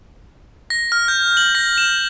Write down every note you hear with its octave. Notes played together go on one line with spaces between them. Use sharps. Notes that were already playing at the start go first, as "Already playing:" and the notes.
A#6
F6
G6
F#7
A#6
E7